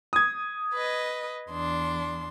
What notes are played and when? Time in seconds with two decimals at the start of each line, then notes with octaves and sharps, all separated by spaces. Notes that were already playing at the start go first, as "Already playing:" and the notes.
0.13 D#6 G#6
0.74 B4 D#5
1.52 E2 D4 C6